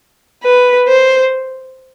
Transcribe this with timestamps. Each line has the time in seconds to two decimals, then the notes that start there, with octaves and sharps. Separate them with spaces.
0.44 B4
0.88 C5